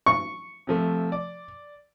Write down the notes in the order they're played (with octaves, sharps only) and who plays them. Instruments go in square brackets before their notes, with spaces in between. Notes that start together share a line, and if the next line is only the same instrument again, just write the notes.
[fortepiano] C#6
[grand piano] C3 F3 A3
D5